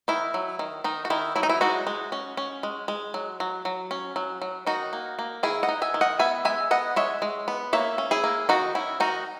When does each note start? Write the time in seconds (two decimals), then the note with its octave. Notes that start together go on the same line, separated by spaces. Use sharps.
0.08 D#3 E4
0.34 F#3
0.59 D#3
0.84 D#3 D#4
1.05 F#4
1.10 D#3 E4
1.36 F#3 E4
1.43 D#4
1.49 E4
1.61 G#3 D#4 F#4
1.87 G#3
2.12 C#4
2.37 C#4
2.63 G#3
2.88 G#3
3.14 F#3
3.40 F#3
3.65 F#3
3.91 C#4
4.16 F#3
4.42 F#3
4.67 D#3 D#4 F#4
4.93 A#3
5.19 A#3
5.43 D#3 E4 G#4
5.63 D#5 F#5
5.69 D#4
5.82 E5 G#5
5.94 D#3
6.01 D#5 F#5
6.19 B3 E5 G#5
6.45 G#3 E5 G#5
6.71 B3 D#5 F#5
6.96 G#3 C#5 E5
7.22 G#3
7.48 B3
7.73 A#3 C#5 E5
7.98 C#4
8.11 E4 G#4
8.24 A#3
8.49 D#3 D#4 F#4
8.75 C#4 E4
9.00 D#3 D#4 F#4